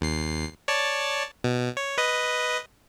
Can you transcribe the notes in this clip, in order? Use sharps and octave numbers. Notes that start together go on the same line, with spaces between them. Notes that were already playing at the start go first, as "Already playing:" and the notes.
D#2 C7
C#5 D5 A5
B2
C#5
B4 D#5